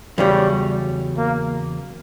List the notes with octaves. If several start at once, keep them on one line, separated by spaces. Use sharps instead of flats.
E2 C#3 F#3 G3
A#3